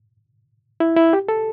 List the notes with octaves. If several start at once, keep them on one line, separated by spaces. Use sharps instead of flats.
E4
E4
G4
A4